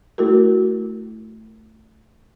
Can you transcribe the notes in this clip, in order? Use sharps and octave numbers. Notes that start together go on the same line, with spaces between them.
A3 E4 F#4 A4 A#4